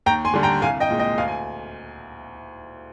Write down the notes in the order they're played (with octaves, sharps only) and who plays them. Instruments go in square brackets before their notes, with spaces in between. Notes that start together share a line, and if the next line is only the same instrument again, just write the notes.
[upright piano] D#2 G5 A#5
G#5 C6
D3 G3 D4
G5 A#5
C2 F5 G#5
D#5 G5
A#2 G#3
D#5 G5
D2 F5 G#5
G#5